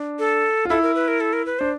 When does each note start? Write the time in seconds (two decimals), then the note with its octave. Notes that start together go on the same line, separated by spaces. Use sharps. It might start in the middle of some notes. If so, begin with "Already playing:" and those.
Already playing: D4
0.19 A4
0.65 F4
0.70 E4 A4
0.82 A#4
0.95 B4
1.08 A#4
1.20 A4
1.33 A#4
1.46 B4
1.59 D4 C5